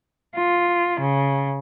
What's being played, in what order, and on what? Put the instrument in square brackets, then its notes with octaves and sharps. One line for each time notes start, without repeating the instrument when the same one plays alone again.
[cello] F4
C#3